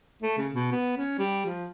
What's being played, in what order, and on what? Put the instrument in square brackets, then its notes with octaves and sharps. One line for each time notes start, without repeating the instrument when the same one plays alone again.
[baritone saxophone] A3
C#3
B2
B3
C#4
G3
F3